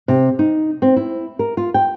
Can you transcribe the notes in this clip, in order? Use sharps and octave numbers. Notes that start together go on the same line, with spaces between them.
C3
D#4
C4
E4
A#4
F4
G5